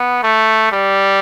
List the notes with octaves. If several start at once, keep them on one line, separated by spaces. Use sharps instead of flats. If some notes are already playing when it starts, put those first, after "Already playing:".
Already playing: B3
A3
G3